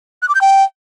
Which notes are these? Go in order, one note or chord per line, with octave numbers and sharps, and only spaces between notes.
F#6
D6
G6
G5